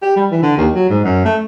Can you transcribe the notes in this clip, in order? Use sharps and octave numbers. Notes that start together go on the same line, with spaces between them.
G4
G3
E3
D3
D#2
F#3
G#2
F#2
A3